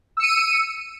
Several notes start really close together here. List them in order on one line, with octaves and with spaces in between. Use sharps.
E6 C#7 D#7